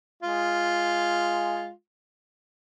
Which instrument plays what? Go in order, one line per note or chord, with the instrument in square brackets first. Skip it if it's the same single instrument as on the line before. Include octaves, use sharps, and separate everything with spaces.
[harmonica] G#3 F4